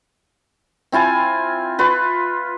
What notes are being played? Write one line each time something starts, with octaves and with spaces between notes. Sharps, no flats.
C4 E4 F4 G#5
F4 B4